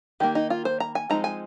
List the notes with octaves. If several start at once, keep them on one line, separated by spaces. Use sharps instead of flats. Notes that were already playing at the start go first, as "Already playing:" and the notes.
D#3 G3 A#3 G4
D#4
F4
C5
A#5
G#5
F3 G#3 C4 D#4 A#5
G#5